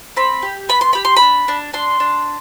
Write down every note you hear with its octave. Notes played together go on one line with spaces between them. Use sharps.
C4 B5
G4
B3 B5
C6
G4 B5
C6
D4 B5
D4
D4 C6
D4